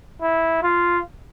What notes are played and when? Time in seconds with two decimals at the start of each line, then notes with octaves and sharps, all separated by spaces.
0.22 E4
0.63 F4